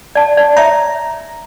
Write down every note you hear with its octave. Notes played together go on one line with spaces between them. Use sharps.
D5 A5
D5
C#5 E5 A#5